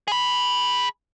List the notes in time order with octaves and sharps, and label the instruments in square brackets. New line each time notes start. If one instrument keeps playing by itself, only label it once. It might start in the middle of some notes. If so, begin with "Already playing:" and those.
[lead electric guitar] G#4 B5